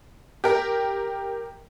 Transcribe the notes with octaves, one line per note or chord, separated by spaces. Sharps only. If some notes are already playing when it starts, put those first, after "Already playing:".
G4 A#4